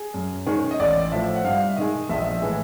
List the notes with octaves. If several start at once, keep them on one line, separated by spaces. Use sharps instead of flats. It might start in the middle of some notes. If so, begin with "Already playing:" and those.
Already playing: G#4
F#2
D#3 G#3 C#4
D#5
A1 D5
A2 F3 E5
F#5
G2 F5
E5
D#3 G#3 D#5
A#1 E5
D#5
E5
A2 E3 G#3